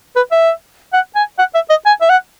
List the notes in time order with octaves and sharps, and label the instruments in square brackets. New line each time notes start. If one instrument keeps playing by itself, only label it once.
[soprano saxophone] B4
E5
F#5
G#5
F#5
E5
D#5
G#5
E5
F#5